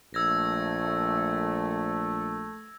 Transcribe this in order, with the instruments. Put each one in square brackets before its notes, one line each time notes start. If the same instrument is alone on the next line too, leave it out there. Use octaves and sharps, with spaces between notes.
[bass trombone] A#1 [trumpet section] A3 [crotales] E6 G#6 A#6